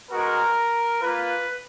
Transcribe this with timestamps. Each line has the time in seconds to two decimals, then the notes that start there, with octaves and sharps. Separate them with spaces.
0.10 G#3 B3 F#4 A#4
1.02 A#3 F4 B4